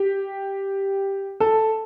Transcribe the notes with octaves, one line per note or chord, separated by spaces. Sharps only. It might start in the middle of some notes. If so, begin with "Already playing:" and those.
Already playing: G4
A4